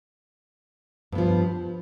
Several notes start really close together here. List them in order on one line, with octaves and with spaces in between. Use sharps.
G2 B3 F3